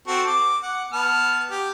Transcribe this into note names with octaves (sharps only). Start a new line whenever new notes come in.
C4 F#4 A4
D6
F#5
B3 A5 F6
G4